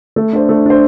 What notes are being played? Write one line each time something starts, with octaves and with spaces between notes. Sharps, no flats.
A3
D4 C5
A3
D4 C5